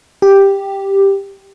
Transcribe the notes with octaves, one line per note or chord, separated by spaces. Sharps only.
G4